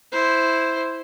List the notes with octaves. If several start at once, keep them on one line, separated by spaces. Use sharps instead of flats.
E4 C5